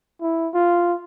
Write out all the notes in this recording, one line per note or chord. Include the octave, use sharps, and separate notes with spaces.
E4
F4